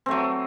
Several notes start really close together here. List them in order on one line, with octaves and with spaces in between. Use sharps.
C4 A3 F#3